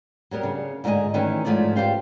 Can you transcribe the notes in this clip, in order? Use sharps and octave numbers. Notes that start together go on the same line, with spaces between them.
F#3 G3 B3 A#4
C#3 D4
G#2 D3 F#4 B4 D#5 G#5
D#3 E3 A3 C#4 D#4
G#2 F3 A3 C#4 D5
G4 B4 C5 F5 G5